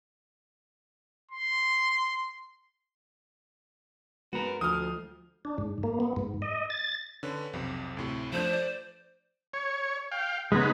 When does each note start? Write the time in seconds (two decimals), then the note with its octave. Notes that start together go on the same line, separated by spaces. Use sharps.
1.31 C6
4.33 G#3 B3 F#4 A#4
4.61 D2 F3 D#6 F6
5.45 D4
5.58 G#2
5.83 A#3
6.00 B3
6.17 G#2
6.42 D#5
6.70 A6
7.23 D3 C#4 B4
7.53 B1 F2 C3
7.97 D2 A2 C3
8.33 F3 A3 D4 C5
8.53 D5
9.53 C#5
10.12 F5 G5
10.52 C#3 G#3 B3 D#4 B4